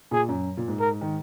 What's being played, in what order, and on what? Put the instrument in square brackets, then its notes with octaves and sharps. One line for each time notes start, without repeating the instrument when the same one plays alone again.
[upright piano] A#2 [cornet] G#4
[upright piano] F#2
A#2
G#2
[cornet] A#4
[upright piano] D#3